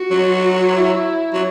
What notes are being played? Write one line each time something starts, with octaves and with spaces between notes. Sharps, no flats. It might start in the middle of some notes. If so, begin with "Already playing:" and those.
Already playing: F#4
F#3
E4
F#3